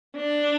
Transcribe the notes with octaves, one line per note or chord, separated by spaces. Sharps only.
D4